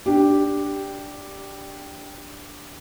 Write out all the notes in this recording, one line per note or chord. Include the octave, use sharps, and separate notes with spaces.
D4 G4